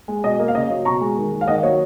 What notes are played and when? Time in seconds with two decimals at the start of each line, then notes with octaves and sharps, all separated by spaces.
0.08 G#3
0.23 B2 D#5
0.39 A#3
0.48 F5
0.55 C#3 D#5
0.70 F#3
0.85 B2 A#5 C#6
1.01 G#3
1.17 D#3
1.32 G#3
1.41 F5
1.47 D#3 D#5 F#5
1.63 F#3 C#5